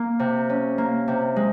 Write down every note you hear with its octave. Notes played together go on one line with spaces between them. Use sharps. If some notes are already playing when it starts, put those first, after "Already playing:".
Already playing: A#3
C3
C#4
A#3
C3
G#3